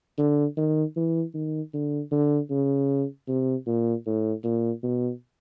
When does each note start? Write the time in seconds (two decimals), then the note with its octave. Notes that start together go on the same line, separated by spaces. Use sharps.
0.18 D3
0.57 D#3
0.96 E3
1.34 D#3
1.74 D3
2.12 D3
2.50 C#3
3.28 C3
3.67 A#2
4.06 A2
4.44 A#2
4.83 B2